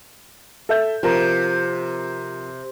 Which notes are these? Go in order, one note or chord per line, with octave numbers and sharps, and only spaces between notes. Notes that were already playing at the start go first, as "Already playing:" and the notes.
A4 E5 G6
C3 F3 A#4 A#5